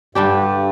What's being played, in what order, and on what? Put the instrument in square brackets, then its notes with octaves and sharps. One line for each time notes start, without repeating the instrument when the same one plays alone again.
[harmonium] G2 [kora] D3 G3 D4 G4